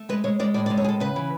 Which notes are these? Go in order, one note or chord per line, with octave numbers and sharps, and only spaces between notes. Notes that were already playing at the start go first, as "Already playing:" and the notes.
Already playing: A3
G#3 B4
G#3 C#5
G#3 D5
A2 D5
D5
G#3
C#5
A2 G#4 A4
C#3 B4
E3